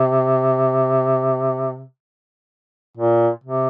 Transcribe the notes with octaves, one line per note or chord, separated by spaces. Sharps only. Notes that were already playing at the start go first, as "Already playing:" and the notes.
Already playing: C3
A#2
C3